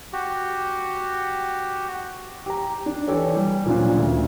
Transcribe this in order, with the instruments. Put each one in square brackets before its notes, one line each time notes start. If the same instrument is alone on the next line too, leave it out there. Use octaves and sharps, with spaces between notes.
[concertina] F#4 G4
[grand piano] G4 A#5
D4
E3 G4 A4 C#5 D5
G3
A#2 F3 F#3 C#4 D4 F4
D2